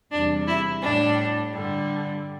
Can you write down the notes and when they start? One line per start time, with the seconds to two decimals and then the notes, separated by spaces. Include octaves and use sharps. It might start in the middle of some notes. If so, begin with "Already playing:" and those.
0.12 E2 C3 G3 D4
0.48 E4
0.82 A2 G3 D4
1.53 G2 D3 G3